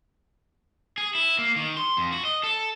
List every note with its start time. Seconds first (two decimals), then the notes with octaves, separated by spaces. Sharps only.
0.98 G#4
1.15 E4
1.39 A#3
1.56 D#3
1.77 C6
1.97 F2
2.12 F#4
2.25 D#5
2.43 A4